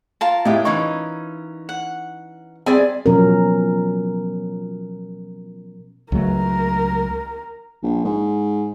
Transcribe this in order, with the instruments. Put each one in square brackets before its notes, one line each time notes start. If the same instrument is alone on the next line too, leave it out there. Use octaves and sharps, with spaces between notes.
[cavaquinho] F4 A#4 A5
[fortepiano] A2 E4 [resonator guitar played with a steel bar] G#3 G4
[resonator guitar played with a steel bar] E3 C#4 D#4 [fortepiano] C#6
[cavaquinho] F#5
[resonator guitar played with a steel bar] G3 D5 G#5 [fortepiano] C4 G#4 [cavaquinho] E5
[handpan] B2 F3 F#3 C#4 A#4
[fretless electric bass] C#2 F#3 A3 [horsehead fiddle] A#4
[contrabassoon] A#1
G#2